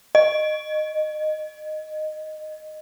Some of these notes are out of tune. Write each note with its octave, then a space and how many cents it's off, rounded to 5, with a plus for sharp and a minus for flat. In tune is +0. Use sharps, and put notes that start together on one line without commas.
D#5 -10